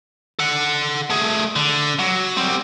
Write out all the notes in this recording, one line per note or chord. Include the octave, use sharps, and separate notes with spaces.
A4 F#5
A3 G#4
D3
F#3
G3 C4